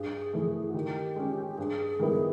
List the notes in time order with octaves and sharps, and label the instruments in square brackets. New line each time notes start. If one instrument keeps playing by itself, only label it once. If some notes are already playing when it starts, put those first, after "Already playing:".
Already playing: [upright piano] G2 [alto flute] G#4
[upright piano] E3 A3
[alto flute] F#4
[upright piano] D#3 [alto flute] G4
[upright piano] G#3 C#4
[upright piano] G2 [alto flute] G#4
[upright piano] D#3 G3 B3 E4